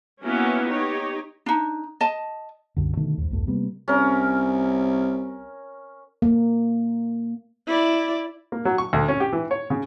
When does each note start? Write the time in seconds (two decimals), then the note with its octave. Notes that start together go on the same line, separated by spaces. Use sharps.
0.23 A#3 B3 C#4 E4 F#4
0.69 D#4 G4 C#5
1.46 D4 D#4
2.01 D#5 A5
2.76 C2 F#2 D3
2.97 B2 D3 D#3 A3
3.18 D#2 G#2
3.31 B1 E2 G2 A3
3.47 C3 G3 A#3 B3
3.88 C2 C#4 A#4
6.22 A#3
7.67 E4 D5
8.52 A#3
8.65 F#3
8.78 C#6
8.93 D2
9.08 C#4
9.20 G4
9.33 E3
9.51 C#5
9.70 C#3